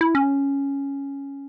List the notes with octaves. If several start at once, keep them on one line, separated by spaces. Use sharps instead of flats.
E4
C#4